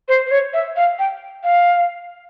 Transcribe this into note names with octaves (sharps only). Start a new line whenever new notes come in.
C5
C5
C#5
E5
F5
G5
F5